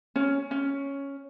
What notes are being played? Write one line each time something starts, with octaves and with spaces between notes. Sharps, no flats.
C#4
C#4